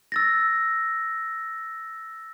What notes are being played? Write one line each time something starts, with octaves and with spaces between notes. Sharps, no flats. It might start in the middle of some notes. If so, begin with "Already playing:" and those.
E6 A6 A#6